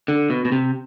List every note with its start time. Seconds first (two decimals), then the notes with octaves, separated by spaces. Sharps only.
0.08 D3
0.30 B2
0.45 B2
0.52 C3